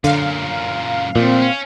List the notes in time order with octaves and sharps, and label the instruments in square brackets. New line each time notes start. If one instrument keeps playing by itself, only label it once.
[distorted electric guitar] F#2 A#2 [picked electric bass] D3 [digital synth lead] F5
[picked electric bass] A#2 [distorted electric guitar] F3 A3 [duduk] C4
[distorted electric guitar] C#4